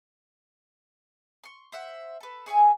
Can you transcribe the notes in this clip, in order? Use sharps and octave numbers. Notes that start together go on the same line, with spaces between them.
C6 C#6
C5 E5 F#5
A4 B4
G#4 C#5 E5 G#5